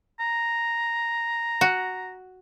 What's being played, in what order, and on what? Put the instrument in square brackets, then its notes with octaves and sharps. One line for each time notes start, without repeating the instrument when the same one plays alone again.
[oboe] A#5
[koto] F#4